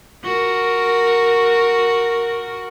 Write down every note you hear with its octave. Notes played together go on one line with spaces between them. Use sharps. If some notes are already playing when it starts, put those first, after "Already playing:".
F#4 A#4